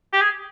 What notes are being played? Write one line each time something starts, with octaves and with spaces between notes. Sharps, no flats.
G4
G#4